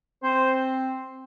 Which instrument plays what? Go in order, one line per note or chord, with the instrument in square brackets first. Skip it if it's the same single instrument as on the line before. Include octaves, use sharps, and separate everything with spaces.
[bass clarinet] C4 [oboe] C5